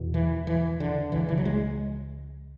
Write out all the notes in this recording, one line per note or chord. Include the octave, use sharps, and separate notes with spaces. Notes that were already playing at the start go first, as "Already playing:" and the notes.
Already playing: E2 B2
E3
E3
D3
C#2 C#3 E3
E3
F#3
G#3